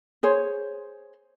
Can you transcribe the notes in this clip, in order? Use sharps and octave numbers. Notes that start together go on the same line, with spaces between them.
G#4 C5 C#5